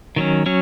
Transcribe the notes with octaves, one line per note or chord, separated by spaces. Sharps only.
D#3 F#3 C#4
F#3 C#4